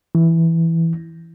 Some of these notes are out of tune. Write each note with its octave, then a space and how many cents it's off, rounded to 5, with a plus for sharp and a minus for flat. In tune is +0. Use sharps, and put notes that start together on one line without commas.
E3 +0